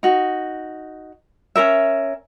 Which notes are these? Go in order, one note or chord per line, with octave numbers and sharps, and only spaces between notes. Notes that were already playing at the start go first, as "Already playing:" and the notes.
D#4 F#4
C#4 D#4 A#4 E5